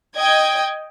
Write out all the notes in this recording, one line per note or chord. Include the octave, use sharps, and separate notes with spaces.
D#5 G5 G#6